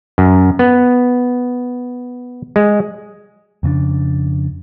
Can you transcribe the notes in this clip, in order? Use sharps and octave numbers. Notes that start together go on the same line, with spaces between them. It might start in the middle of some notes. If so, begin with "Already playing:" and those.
F#2
B3
G#3
F2 C#3 C4 D4